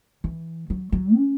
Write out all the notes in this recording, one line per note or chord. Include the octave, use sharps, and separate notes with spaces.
E3
F#3
F#3
C#4